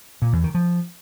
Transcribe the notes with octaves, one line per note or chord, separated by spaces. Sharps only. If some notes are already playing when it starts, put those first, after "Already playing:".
A#2
E2
D#3
F3